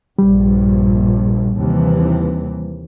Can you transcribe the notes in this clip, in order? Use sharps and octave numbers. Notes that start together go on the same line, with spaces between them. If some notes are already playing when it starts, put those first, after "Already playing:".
A#1 G2 G3
D#2 C3 E3